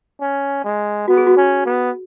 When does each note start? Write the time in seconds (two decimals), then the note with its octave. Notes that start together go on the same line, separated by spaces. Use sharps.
0.21 C#4
0.64 G#3
1.08 B3 F#4
1.17 G#4
1.27 F#4
1.37 C#4
1.66 B3